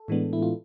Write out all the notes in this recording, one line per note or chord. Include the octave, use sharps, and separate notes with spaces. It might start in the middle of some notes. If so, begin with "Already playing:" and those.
Already playing: A4
A2 E3 G#3 B3 D4
E4
F4